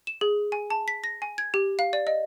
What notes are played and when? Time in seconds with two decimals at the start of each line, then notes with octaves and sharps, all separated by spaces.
0.07 E7
0.21 G#4
0.52 G#5
0.70 A5
0.88 B6
1.04 A#6
1.22 G#5
1.38 G#6
1.54 G4
1.79 F5
1.93 D5
2.07 D#5